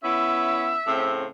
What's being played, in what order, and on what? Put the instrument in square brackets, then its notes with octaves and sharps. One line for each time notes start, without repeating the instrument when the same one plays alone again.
[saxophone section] B3 C#4 E4 [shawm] E5
[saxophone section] A2 C#3 C4